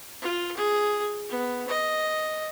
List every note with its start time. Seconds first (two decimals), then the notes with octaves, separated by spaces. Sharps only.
0.21 F4
0.57 G#4
1.29 B3
1.68 D#5